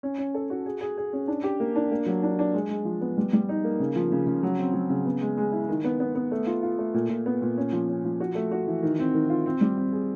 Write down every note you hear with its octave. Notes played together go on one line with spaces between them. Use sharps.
C#4
C#4
A4
F#4
G#4
G#4
G#4
C#4
D4
G4
A#3
D4
A#3
F#3
D4
D4
G#3
G#3
F3
B3
G3
G3
D#4
A#3
C#3
F3
C#3
C#3
F#3
C4
F#3
C#3
B3
G#3
G#3
E4
D#3
B3
B3
B3
A3
F4
F4
A3
A#2
A#2
B3
A#2
C#4
F3
C#4
F3
F#4
A3
F#4
E3
D#3
C4
D#3
F4
C4
G3
C4
G#4